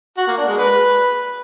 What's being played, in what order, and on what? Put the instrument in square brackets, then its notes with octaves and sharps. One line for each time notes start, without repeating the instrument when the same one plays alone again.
[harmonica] F#4
A#3
D4
G#3
B4